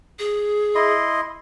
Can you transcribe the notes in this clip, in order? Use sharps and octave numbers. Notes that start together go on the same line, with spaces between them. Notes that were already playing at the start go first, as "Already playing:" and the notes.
G#4
E4 D#5 C6